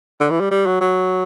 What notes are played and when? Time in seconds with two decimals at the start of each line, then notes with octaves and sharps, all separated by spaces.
0.20 D3
0.30 E3
0.40 G3
0.51 G3
0.66 F#3
0.81 F#3